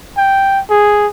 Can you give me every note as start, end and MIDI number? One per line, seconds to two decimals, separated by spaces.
0.17 0.60 79
0.70 1.07 68